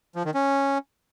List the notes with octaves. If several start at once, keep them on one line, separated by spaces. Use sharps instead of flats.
F3
D#3
C#4